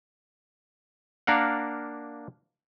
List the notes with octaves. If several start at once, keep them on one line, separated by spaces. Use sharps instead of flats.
A#3 D4 A#4 F5 F#5